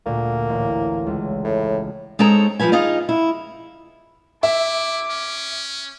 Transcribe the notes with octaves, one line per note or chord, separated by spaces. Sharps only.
D2 A#2 A#3
A1
C#2
A2
G#3 C4 D#4 A4 C#5 A#5
G2 E3 F3 B4 G#5
D#4 F4 G#4 D#5
E4
E4 E5 D6
C#4